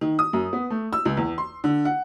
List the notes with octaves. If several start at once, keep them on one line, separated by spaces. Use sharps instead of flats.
D#3
D#6
F#2
B3
A3
E6
C#2
E2
C6
D3
F#5